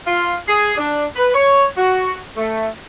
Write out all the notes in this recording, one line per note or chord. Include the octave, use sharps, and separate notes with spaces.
F4
G#4
D4
B4
C#5
F#4
A3